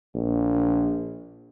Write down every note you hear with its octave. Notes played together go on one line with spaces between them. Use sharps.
A#1